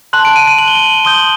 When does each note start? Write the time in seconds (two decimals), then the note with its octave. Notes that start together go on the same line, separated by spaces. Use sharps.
0.13 A5 C6 F#6 F#7
0.25 D7
0.36 D#7
0.47 D#7
0.58 F#7
0.68 G7
0.75 F#7
1.05 C6 D#6 G6 G7
1.14 F#7